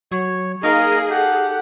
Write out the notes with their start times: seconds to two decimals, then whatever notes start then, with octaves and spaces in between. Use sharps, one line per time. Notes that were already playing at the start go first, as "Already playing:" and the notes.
0.12 F#3 C#5
0.63 A#3 D#4 G#4 A#4 D#5 F5
1.10 G4 A4 F#5